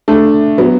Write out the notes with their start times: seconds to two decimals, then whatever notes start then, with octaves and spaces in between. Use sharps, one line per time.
0.08 A3 D4
0.58 F#3 B3